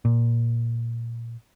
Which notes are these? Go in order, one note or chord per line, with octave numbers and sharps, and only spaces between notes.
A#2